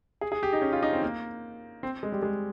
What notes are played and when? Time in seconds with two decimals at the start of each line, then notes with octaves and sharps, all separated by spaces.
0.21 G#4
0.32 G#4
0.43 G4
0.53 D#4
0.62 C#4
0.73 F4
0.83 D#4
0.93 C4
1.02 A#3
1.83 C4
2.03 G#3
2.12 G3
2.23 G#3